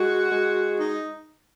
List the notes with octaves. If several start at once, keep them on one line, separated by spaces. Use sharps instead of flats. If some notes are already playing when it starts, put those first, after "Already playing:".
Already playing: G#3 F#4
G#3
D#4